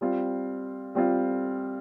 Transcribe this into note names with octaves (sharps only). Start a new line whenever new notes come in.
G3 C4 F4
G3 C4 F4